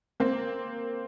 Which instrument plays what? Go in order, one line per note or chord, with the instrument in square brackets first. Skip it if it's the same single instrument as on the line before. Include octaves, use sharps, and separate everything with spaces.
[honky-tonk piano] A#3 C4